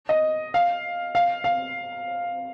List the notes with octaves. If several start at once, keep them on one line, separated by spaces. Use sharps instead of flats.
D#5
F5
F5
F5